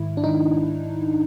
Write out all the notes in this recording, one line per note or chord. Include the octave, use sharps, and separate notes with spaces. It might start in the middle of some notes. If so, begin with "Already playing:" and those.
Already playing: G#2 D#3 E4
D4
G#2 D#3 D#4